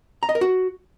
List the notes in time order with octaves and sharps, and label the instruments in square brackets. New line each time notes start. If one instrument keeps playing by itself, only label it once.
[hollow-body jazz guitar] A#5
D#5
A#4
F#4